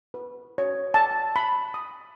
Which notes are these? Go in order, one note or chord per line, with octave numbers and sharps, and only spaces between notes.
B4
C#5
A5
B5
D#6